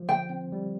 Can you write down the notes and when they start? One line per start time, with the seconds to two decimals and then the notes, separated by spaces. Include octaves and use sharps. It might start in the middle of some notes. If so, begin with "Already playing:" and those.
Already playing: F3
0.09 D3 G5
0.30 C4
0.52 G3